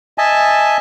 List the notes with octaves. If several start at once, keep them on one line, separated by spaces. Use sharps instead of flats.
D#5 E5 G#5 A5